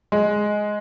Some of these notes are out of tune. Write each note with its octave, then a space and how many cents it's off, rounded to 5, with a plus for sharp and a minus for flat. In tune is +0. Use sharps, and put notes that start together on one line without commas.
G#3 +5